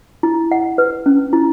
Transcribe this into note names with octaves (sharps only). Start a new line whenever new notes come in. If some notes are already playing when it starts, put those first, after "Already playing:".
E4
F#5
B4
C#4
E4